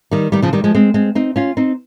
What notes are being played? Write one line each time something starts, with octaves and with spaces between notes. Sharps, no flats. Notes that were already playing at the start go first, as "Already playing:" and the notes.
D#3 G3
D#3 G3
C#3 F3
D#3 G3
F3 G#3
G#3 C4
G#3 C4
C4 D#4
C#4 F4
C4 D#4